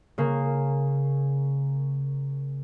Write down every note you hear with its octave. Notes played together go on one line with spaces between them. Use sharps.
C#3 A#3